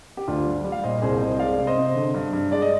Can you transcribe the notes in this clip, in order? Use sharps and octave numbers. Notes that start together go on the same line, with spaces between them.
G4
D2 D4 F4
G3
G3
F5
A#2 C5 D#5
C2 G#4 C5
C2 C5 D#5
G#3 D5 F5
C3
C5 D#5
C3
D3
G2
G2
G#3 D5
D#5